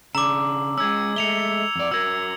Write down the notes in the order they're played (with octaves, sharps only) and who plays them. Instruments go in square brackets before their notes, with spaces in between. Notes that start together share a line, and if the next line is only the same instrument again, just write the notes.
[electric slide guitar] C#3 D4 [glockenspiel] A#5 D6 [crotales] E6
[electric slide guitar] G#3 C#4 [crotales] E6 G#6
[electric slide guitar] G#3 A3 [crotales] C#7 F7 G7
[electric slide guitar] F2 D5
[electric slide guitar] F#3 A#4 [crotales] E6 G#6